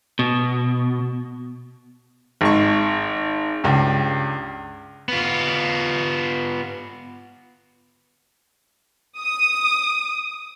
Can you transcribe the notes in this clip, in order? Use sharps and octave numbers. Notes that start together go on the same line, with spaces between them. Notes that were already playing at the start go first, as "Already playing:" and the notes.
B2
G#1 G#3 C#6
C#2 G2
B3 F4
D#6